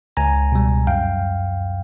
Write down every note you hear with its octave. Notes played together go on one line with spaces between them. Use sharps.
C#2 G#5 A#5
B2 G3
F#2 F5 G5